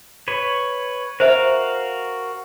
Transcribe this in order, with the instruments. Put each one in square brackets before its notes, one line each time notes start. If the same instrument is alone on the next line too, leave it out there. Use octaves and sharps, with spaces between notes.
[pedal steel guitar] B4 C#5
[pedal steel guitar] F#4 A#4 F5 [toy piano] C5 E5